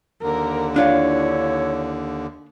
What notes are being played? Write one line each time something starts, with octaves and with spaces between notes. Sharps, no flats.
D#2 D3 A#4
D4 E4 F4 C#5 F5